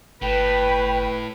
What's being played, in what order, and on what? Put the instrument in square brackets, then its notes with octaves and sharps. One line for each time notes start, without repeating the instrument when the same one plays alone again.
[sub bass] G1 [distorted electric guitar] A2 [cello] B4 [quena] G5